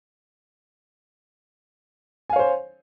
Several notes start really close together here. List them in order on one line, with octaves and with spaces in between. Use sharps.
G#5 F5 C#5 C5